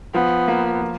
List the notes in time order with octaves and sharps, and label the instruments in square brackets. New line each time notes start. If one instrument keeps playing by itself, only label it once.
[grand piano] F3 [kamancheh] B3
[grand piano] A#3
F3